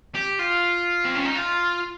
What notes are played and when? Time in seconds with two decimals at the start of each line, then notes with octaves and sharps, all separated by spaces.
0.15 G4
0.39 F4
1.05 C4
1.16 C#4
1.25 D#4
1.35 F4